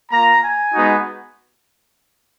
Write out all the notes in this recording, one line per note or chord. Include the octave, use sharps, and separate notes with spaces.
A#3 F4 A#5
G#5
G#3 B3 D#4 F#4